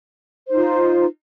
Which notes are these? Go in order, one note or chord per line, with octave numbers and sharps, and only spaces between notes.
D#4 F4 C5